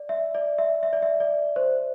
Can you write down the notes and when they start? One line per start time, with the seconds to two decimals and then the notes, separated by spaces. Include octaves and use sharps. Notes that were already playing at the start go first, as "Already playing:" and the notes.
Already playing: D5
0.09 E5
0.35 D5
0.58 E5
0.83 E5
0.93 D5
1.02 E5
1.20 D5
1.56 C5